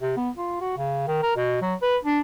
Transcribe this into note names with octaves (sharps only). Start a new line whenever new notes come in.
C3
B3
F4
F#4
C#3
D#3
A#4
B2
F#3
B4
D4